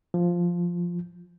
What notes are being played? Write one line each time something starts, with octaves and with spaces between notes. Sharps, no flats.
F3